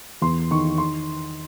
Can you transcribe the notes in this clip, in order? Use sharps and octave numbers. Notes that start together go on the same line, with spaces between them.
E2 C6
D#3 C#6
C6